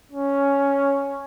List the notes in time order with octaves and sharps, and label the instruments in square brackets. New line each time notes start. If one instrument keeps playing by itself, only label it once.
[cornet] C#4